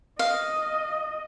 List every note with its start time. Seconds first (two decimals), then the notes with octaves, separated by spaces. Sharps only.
0.19 D#5 F5